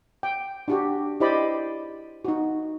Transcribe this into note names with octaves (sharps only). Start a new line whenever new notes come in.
G5
D4 F#4 G4
E4 G4 C5 D5 D#5 B5
D#4 F#4